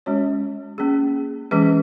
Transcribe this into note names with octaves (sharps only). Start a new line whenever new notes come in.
G#3 C#4 F#4 C#5
A#3 C#4 G#4
E3 G#3 C#4 G#4 B4